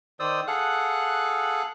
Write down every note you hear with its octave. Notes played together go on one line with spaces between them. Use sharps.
D#3 C5 D5 D#6 E6
G#4 A4 F5 F#5 F#6